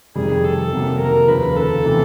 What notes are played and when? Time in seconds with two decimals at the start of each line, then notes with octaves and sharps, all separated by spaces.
0.15 F2 C3 D#3 G3 G#4
0.44 A4
0.72 F2 C3 D#3 F#3 A#3
0.99 A#4
1.28 D#2 C#3 F3 B4
1.56 A4
1.85 C3 E3 A3